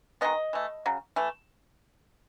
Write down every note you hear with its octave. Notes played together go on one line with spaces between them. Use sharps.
D#3 G#3 B3 D#5
E3 A3
C#3 F#3
E3 A3